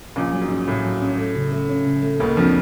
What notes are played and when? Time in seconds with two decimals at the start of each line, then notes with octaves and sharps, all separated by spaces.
0.16 A#1 A#2 C#4
0.33 F#3
0.42 G#2
0.50 C#4
0.67 A2 C#4
0.85 F#3
1.01 C#4
1.18 A3
1.36 C#3
1.52 A3
1.69 C#4
1.85 C#3
2.02 A3
2.19 C#2 C#3 A#3
2.37 F2 F3 D4